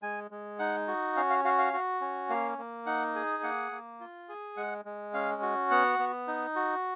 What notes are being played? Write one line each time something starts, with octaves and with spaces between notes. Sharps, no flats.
G#3 G#5
G#3
D#4 F#5
F#4
C#4 F5
F5
F#4 F5
F5
F#4
C#4
A#3 F5
A#3
D#4 F#5
G#4
A#3 F#5
A#3
F4
G#4
G#3 F#5
G#3
C#4 F5
F#4
B3 F#5
B3
D#4
F#4